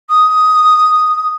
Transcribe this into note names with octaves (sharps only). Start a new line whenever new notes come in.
D#6